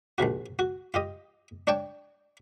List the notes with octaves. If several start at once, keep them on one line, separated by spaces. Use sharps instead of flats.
A#1 D#2 C3 F#4
F#4
F4 G4 D#5
D4 C#5 D5 G5 A5